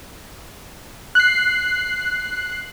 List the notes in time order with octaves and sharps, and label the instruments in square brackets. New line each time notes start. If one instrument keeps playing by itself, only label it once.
[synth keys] F#6 C7